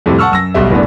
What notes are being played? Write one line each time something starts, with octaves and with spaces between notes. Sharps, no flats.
F2 A2 C3 G3 C4
F#5 A5 C#6 E6 F6
F#2 E6 A#6
B1 B2 G3 E5
F#1 A2 G3 B3 D4